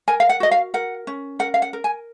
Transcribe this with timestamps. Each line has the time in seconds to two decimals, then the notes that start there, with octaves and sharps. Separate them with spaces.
0.08 A#4 G#5
0.20 F5
0.29 F#5
0.40 F#4 D#5
0.51 F5
0.74 A#4 F#5
1.07 C#4
1.39 A#4 F#5
1.54 F5
1.62 F#5
1.73 A#4
1.84 G#5